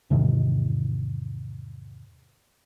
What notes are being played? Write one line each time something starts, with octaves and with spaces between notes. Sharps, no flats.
E2 G#2 C3 D#3